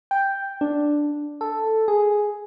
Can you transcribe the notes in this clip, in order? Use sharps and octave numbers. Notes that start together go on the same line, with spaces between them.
G5
D4
A4
G#4